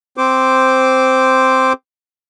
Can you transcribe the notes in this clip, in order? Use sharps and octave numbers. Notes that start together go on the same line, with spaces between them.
C4 C5 D6